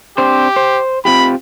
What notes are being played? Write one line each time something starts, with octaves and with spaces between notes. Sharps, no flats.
C4 D4 G4 C5
C5
C4 F4 G4 B5